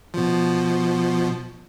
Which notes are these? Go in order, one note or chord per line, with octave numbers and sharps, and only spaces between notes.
B2 F3